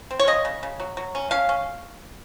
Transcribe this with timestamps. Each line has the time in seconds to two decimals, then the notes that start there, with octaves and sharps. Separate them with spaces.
0.11 C4
0.19 C#5
0.27 C#3 D#5
0.45 C#3
0.63 C#3
0.80 F#3
0.97 F#3
1.15 C#4
1.31 C#4 F5
1.49 C#4